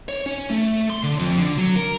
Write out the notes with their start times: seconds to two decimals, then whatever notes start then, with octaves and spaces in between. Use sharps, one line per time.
0.09 C#5
0.26 C#4
0.50 A3
0.90 C6
1.03 D3
1.19 F2
1.37 D3
1.58 F#3
1.76 A#4